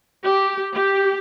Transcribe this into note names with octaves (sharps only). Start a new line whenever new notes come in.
G4
G4